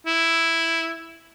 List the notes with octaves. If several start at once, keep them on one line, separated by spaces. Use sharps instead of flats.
E4